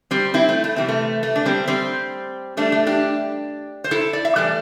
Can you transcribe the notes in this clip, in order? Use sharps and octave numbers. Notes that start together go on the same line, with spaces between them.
G3 C4
C4 E4
A3
A3
C3 E3 G3 C4
A3
A3
D4
G3 C4
G3 C4
A2 E3 G3 A3 D4
A3
D4 G4
C5
E4 A4
D5
E5
A2 E3 G3 A4 D5